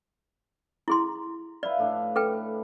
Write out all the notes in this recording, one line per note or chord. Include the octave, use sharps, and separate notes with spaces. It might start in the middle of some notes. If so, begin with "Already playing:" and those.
E4 G#4 A#5 C6
B4 D5 E5 F5
A2 D4 F5
A4 B4 G5